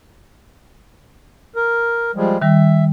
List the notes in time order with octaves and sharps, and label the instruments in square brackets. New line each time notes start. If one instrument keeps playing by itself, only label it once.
[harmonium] A#4
F3 G3 G#3
[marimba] D#3 G3 [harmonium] E5